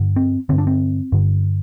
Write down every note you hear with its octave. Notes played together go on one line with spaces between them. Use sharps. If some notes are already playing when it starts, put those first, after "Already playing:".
Already playing: G2 D3
C4
G2 D3 C4
D4
C4
G2 D3